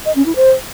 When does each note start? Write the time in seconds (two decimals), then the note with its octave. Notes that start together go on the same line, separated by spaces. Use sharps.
0.05 D#5
0.16 C#4
0.26 E4
0.36 C5